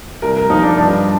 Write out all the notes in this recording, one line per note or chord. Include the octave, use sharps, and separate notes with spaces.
C2 A#4
A#4
F3 D#4
D4
G2 D4